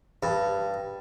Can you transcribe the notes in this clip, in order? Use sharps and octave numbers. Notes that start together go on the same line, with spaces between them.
G2